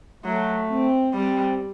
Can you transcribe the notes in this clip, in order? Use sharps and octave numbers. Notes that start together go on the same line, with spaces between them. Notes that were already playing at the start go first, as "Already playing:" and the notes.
F#3 A3
C4
G3 C4